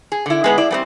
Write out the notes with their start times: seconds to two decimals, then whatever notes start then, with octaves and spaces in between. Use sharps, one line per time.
0.12 G#4
0.26 D3 E4
0.44 G#3 B3 G#4
0.58 E4 D5
0.71 G3 B3 C4